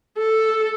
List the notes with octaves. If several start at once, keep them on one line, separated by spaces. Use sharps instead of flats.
A4